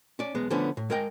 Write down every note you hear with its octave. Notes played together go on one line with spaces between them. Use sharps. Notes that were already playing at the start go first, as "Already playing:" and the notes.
C#4 D5
B1 G#3 B3
D3 F3 A3 B3 C#4 D4
A2
G#3 A#4 D#5 G5